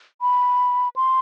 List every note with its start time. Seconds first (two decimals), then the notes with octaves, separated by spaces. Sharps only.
0.21 B5
0.96 C6